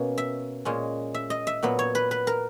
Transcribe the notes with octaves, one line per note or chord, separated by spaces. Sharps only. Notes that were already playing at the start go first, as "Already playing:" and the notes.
Already playing: B2 A#3 C#4
E5
A#2 G#3 C#4
E5
D#5
E5
A#2 F#3 B3
C#5
B4
B4
A#4